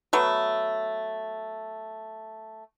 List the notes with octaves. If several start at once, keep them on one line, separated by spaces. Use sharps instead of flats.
F#3 A3 B3